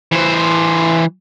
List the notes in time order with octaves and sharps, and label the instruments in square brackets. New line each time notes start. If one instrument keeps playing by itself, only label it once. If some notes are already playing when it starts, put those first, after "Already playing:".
[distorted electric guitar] E3 C5